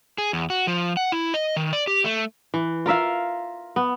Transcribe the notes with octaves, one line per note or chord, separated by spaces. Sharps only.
G#4
E2
F#4
F3
F#5
E4
D#5
D#3
D5
G4
A3
E3
F4 A#4 E5 F5
B3